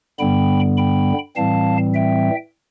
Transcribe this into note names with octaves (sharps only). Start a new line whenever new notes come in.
G2 D3 G3 B3 G5 B5
G5 B5
A2 E3 G3 C4 F5 A5
E5 G5